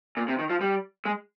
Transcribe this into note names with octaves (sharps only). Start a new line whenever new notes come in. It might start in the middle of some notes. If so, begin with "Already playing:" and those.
A#2
C3
D#3
F3
G3
G#3